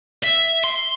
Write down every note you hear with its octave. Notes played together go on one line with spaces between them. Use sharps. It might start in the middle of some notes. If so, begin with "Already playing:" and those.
E5
C6